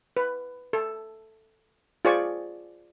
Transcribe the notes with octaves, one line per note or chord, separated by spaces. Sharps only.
B4
A4
F4 G#4 C5 D5 G#5 C#6